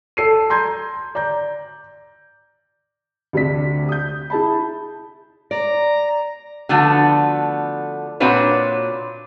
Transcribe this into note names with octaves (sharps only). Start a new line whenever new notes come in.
A4 C7 D#7
A#5 C6 G6 G#6
D5 A#5 G6
D2 C3 D4 B6
D#6 G6
E4 G#4 A5 B5
D5 A#5
D3 F3 A3 B3 F#4
A#2 C4 D4 F#4 B4 C#5